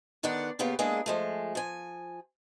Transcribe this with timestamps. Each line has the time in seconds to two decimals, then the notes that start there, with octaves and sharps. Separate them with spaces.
0.23 D3 D#3 B3 D4 D5 F#5
0.59 C#3 A#3 B3 F4 G4
0.79 G#3 A#3 D4 E4 G#4
1.06 F3 G#3 A3
1.55 F3 G#5